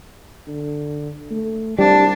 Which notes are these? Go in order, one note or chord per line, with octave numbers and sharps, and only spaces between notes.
D3
A3
C2 G3 D4